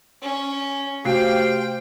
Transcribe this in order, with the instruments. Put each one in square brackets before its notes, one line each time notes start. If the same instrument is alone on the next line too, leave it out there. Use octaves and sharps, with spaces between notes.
[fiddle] C#4
[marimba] C3 A3 F#4 [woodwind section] G4 C5 F5 [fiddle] G5